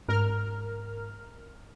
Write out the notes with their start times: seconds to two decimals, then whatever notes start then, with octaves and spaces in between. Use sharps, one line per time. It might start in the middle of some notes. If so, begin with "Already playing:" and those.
0.09 G#2 A#4 F6